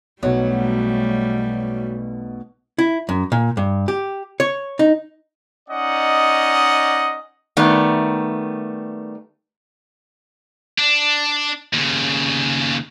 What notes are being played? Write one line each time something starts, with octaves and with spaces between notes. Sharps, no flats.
B1 B2 F#3 G3 A3
E4
F#2
A#2
G2
G4
C#5
D#4
C#4 D#4 D5 D#5 F#5
D#3 G3 A3 B3
D4
D#2 C#3